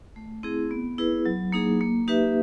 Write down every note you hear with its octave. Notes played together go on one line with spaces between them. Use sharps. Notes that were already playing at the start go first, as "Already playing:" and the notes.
A3
C4 E4 G#4
B3
E4 G#4 B4
F#3
A#3 D#4 G#4
A#3
D#4 G4 B4 E5